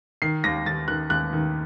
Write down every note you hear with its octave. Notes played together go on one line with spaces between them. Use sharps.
D#3 C7
D#2 A#6
D#2 A6
D#3 F#6
D#2 F#6
D#3